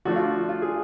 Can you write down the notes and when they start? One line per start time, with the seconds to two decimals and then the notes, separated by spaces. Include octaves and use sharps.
0.05 F3 A3 D4 F#4
0.16 F4
0.38 F4
0.49 F4
0.62 G#4